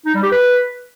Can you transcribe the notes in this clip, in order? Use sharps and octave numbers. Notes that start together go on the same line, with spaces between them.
D#4
G3
G4
B4